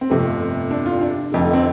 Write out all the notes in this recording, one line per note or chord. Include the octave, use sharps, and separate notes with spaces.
C4
G1 F2 C3 F3 A3
D4
F4
D4
F1 F2 D3
A3
C4